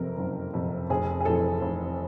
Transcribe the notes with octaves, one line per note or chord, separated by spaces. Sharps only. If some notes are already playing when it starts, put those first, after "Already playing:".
Already playing: F#1 F2 C3 A#4
F#1
F2 C3
F1 G#4
G#4
F2 C3 E3 A4
F1